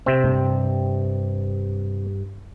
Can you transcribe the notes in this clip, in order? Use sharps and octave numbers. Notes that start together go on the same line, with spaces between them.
C3 C4
G2